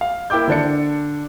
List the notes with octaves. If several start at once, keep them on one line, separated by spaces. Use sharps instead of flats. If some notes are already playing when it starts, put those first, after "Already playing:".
F5
A#3 E4 G5 D6 G6
D3 D4 C#7